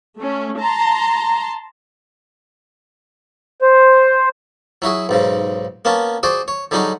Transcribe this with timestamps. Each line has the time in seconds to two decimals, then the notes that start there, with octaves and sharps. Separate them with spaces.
0.20 A3 C#4
0.58 A5 A#5 C6
3.62 C5
4.82 F#3 E4 F#4 G#4
5.09 B1 G#2 C#3
5.85 A#3 B3 C#4 A5
6.23 F#4 G#4 C5 D5
6.48 C#5
6.71 D3 F#3 G3 D#4 G#4 C#5